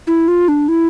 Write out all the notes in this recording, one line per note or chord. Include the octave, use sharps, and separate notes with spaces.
E4
F4
D4
E4